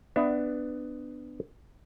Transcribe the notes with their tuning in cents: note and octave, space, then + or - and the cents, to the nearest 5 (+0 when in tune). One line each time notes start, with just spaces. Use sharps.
B3 +15 D4 +15 E5 +25